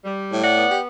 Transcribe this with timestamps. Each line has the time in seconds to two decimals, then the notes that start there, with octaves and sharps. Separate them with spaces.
0.04 G3
0.31 A2
0.42 D5 F#5
0.56 B3
0.69 G4